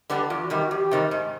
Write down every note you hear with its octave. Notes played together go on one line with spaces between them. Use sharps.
D3 G3 B3
E2 F4
F#4
C3 D#3 G3
G4
F#4
E2 G4
C3 D#3 G3
G#2